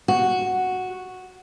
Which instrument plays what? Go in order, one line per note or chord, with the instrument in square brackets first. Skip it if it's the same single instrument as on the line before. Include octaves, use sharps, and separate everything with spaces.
[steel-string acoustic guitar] F#4